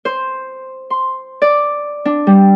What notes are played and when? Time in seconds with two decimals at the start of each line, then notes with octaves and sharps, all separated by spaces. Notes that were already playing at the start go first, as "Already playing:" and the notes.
0.05 C5
0.90 C6
1.42 D5
2.05 D4
2.27 G3